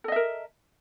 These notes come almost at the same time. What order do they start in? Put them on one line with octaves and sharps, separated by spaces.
A4 D#5 E5 A#4